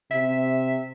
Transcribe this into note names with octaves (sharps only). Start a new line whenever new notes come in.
C3 E5